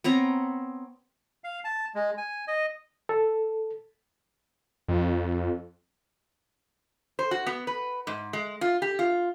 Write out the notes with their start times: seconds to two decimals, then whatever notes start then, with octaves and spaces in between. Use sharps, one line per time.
0.04 B3 C4 C#5 A#5
1.44 F5
1.65 A5
1.95 G#3
2.18 G#5
2.48 D#5
3.09 A4
4.88 F2
7.19 C5
7.31 F#4
7.47 B3
7.67 B4
8.07 G#2
8.33 G#3
8.61 F4
8.82 G4
8.99 F4